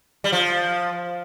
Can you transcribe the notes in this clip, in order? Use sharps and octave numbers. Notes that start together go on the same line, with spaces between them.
G3
F3